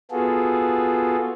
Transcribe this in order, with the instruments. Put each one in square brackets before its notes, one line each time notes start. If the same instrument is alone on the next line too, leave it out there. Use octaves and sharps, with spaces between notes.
[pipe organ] B3 F4 F#4 G#4 A4